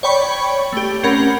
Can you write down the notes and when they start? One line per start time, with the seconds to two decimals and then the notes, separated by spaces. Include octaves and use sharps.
0.03 C#5 D5 G5 B5 C#6
0.73 A3 G4
1.03 C4 C#4 A#4 F#5 B5